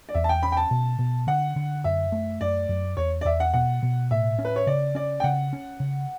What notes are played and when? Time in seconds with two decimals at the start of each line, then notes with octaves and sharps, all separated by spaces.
0.09 D5
0.14 E2 E5
0.24 A5
0.29 G5
0.43 C#4 B5
0.52 G5
0.57 A5
0.71 B2
0.99 B2
1.27 D3 F#5
1.56 D3
1.84 F#2 E5
2.12 A3
2.41 F#2 D5
2.69 F#2
2.97 E2 C#5
3.21 D5
3.25 E2 E5
3.40 F#5
3.54 B2 F#5
3.83 B2
4.11 A2 E5
4.39 C#4
4.45 B4
4.56 C#5
4.67 C#3 D5
4.95 C#4 D5
5.20 G5
5.24 C#3 F#5
5.53 C#4
5.80 C#3